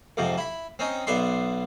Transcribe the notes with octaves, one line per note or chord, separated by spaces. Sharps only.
F2 G#2 C3 F3
E4 B5
C4 C#4 D#4
B1 B2 B3 D5 E5 C6